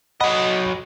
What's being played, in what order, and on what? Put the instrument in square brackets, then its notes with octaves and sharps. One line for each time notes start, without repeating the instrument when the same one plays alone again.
[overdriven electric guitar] F#3 D#5 [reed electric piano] F#5 B5